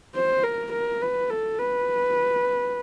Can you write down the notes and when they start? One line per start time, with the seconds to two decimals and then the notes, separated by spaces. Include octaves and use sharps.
0.15 C5
0.43 A#4
0.73 A#4
1.01 B4
1.30 A4
1.58 B4